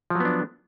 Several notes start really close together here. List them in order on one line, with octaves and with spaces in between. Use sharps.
F3 F#3 B3 D4